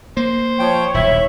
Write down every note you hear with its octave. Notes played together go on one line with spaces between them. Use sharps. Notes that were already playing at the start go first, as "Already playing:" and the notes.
A#3 C5
F3 C#5 G5
D#1 B1 E4 E5